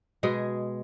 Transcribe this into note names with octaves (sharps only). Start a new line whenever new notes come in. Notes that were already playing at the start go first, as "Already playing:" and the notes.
B2 G#3 G#4